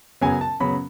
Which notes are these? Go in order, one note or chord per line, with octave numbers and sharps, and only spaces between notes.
F#2 C#3 F#3 B3 G#5
A5
F#2 C#3 F#3 B3 B5